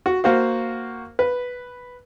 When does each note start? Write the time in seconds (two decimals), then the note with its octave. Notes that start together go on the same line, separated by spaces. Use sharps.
0.06 F#4
0.24 A#3 F#4 C5 F5
1.19 B4